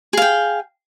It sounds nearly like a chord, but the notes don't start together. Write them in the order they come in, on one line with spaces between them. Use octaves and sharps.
G#4 F5 G5